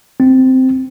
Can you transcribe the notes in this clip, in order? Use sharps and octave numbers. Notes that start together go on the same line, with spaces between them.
C4